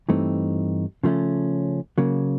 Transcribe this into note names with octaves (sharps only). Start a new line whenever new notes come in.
G2 E3 A3 C4 D#4
C#3 F3 A3 C#4
C#3 F#3 A#3